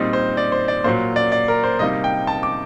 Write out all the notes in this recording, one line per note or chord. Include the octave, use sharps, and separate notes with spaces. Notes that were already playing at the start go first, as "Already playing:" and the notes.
Already playing: A#2 G3 C4 D#4
C5
D5
C5
D5
A#2 F#3 A#3 C5
D5
D5
A#4
C5
C3 G3 A#3 D#4 D#5
G5
A5
D6